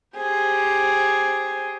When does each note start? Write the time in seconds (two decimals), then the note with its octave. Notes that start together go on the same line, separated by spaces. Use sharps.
0.16 G4 G#4 C5